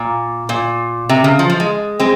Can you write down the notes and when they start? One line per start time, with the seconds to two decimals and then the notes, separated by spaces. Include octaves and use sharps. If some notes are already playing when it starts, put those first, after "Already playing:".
Already playing: A#2
0.49 A#2
1.09 C3
1.24 C#3
1.39 F3
1.50 F3
1.60 G#3
2.00 G#3 C4